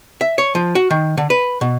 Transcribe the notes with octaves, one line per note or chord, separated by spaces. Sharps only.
E5
C#5
F3
F#4
D#3
D3
B4
B2